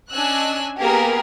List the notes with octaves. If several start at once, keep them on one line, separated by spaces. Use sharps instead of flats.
C#4 D4 D#5 G#5 E6 F#6
A#3 B3 G4 G#4 A#4 B4